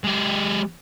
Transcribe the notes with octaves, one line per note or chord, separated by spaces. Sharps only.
G#3 G4